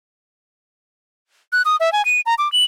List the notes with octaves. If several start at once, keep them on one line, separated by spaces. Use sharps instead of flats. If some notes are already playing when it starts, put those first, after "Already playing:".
F#6
D#6
E5
G#5
D#7
A#5
D6
F#7